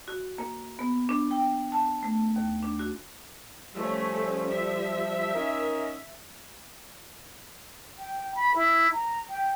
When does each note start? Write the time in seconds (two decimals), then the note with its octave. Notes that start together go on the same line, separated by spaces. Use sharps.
0.08 F#4
0.38 A#3
0.79 B3
1.09 D4
1.31 G5
1.72 A5
2.03 A3
2.36 D#2
2.63 D4
2.79 F#4
3.74 F3 G3 A3 C#4
4.48 E5
5.34 C#4 D#4 A#4
7.98 G5
8.34 B5
8.54 E4
8.92 A#5
9.29 G5